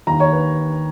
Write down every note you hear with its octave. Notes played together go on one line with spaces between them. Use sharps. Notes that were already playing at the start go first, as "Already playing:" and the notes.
D#2 A#5
C#5
B4